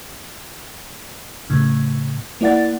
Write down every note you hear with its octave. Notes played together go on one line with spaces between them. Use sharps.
A2 C#3
A#3 E4 D5 F#5 A6